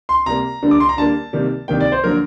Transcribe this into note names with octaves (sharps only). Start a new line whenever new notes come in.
C6
C3 G3 A#3 A#5
D3 G3 A#3
D6
C6
A#5
D3 G3 A#3 A5
C3 D#3 G3 A#3
C3 D#3 G3 A#3 G5
D5
C5
D3 F#3 A#3 A#4